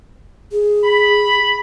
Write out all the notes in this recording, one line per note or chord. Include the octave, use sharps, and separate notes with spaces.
G#4
B5